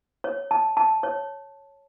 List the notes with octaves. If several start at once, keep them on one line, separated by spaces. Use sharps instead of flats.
C#5
A5
A5
C#5